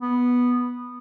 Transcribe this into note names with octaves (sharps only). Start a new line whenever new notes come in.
B3